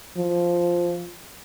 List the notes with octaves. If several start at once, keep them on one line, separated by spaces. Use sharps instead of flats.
F3